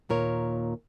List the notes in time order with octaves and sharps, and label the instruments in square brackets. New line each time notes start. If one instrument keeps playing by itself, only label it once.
[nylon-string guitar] D#2 A#2 A#4 C#5